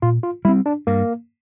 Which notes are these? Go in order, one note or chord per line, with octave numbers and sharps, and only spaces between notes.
A#2 F4
F4
G3 C4 E4
D4
G2 A#3